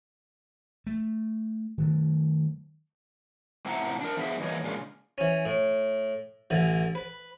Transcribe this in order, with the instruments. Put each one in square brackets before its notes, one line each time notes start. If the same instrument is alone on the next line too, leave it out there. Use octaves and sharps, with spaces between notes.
[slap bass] A3
D#3 F#3 A3
[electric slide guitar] A2 C3 F3 E4 F#5 A#5
D4 A#4
F3 B3 G#4 E5
G2 E3 A#3 C#5 D#5
A#2 C#3 G#3 D4 F4
[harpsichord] E3 C#4
A2
A1 D3 E3
B4